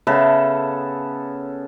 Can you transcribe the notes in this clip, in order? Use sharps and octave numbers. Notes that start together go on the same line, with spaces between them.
C#3 B3 A4 E5